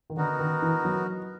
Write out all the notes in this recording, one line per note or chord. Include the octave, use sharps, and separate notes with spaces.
D#3
D3 B3 D#4 F#4 A#4
D#3
E3
F#3